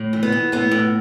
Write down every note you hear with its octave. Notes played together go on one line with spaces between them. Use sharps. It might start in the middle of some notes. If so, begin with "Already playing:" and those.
Already playing: A2
E3
B3
E3
A2 B3
A2